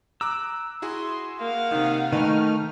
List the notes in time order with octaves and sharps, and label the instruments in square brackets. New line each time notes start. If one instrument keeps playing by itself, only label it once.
[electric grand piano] A#5 D6 F#6 [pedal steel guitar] E6
[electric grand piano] E4 F#4 G#4 [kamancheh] C6
[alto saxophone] A#3 [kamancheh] F5 F#5
[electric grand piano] C3 A#3 [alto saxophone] D#3
[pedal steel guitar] D#3 A3 [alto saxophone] D#4 [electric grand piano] B4 G5 C#6 [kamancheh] F6